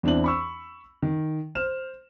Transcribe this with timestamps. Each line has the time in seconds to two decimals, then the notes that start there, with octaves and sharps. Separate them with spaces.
0.03 E2 C4 D4 E4 F#7
0.24 B5 C#6 E6
1.02 D#3
1.55 C5 F6 E7